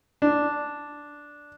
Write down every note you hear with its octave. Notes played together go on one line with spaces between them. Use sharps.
D4